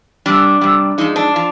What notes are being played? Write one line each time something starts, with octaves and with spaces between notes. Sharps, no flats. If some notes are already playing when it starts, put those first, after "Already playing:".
C3 G3 D4
C3 G3
G#2 F3 G#3 D#4
D4
F3